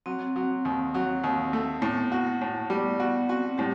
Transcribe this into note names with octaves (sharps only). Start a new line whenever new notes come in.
F#3 C4
F#3
D#2
F#3
D#2
A3
A2 B3
F#4
A3
A2
G3 B3
B3 F#4
C4 F#4
A2 G3 G4